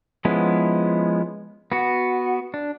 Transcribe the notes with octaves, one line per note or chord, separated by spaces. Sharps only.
F3 G#3 B3 C#4 E4
B3 F#4
D4